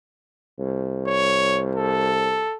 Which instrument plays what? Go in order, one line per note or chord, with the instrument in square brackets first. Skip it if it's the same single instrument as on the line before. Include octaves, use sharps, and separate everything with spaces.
[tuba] C2
[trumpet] C#5
A4